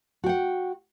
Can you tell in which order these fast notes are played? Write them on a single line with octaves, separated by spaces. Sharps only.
F#4 G5 F#5